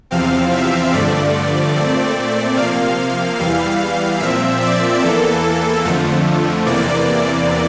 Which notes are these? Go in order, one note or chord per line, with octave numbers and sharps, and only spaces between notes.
E2 C3 F3 C4 F5
E5
G2 D3 F3 A3 D5
A#2 A3 C4
C3 F3 A#3 F5
E2 E3 G3 F5
A#2 F3 C4 E5
D5
E2 E3 A#3 A4
F2 D3 F3 A3
E2 C3 E3 A#3 D5